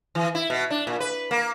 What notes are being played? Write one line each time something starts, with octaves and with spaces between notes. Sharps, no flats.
E3
E4
B2
D4
A#2
B4
A#3